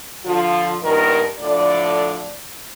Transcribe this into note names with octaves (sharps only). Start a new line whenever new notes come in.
D3 F3 F4
G2 A#2 D#3 B3 A#4
A2 D3 F3 D5